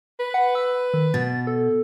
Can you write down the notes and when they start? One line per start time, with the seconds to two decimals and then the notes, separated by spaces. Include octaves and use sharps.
0.20 B4
0.34 F#5
0.55 E6
0.94 D#3
1.14 B2 A6
1.47 A4